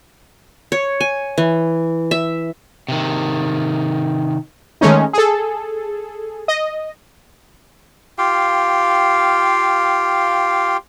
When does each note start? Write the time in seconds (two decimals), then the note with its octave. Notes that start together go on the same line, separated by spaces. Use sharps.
0.72 C#5
1.01 G#5
1.38 E3
2.11 E5
2.88 C3 D#3
4.81 D#3 G#3 A3 C#4 D#4
5.13 G#4 A4
6.48 D#5
8.18 F4 G4 F5 G5